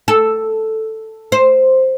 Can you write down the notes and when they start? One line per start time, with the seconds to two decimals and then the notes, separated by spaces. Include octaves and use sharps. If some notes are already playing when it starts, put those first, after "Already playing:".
0.08 A4
1.32 C5